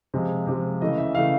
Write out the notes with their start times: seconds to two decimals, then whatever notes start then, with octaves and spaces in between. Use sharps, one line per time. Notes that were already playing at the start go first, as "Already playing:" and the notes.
0.14 C3 F3 G#3
0.47 C3 F3 G#3
0.81 C#3 E3 A3 D#5
0.98 E5
1.15 C#3 E3 A3 F5